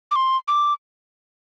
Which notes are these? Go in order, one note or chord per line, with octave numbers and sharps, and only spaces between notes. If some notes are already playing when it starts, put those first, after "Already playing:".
D6
C6
D6